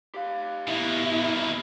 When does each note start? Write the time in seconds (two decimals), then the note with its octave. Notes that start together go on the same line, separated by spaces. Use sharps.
0.14 G4 F5
0.68 B2 A#3 B3 E4
1.22 F2 G3